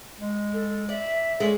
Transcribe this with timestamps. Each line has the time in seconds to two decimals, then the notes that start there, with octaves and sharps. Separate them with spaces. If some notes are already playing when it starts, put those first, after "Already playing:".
0.20 G#3
0.53 A4
0.89 D5 E5
1.40 G#3 C#4 A4 D5